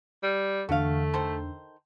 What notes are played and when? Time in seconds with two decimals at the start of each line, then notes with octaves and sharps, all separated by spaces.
0.23 G3
0.69 E2 D3 A3 F#4 F5
1.14 D#3 A4 C5